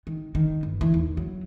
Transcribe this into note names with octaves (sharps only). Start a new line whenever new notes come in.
D#3
D#3
G1
E3
D#2
F#3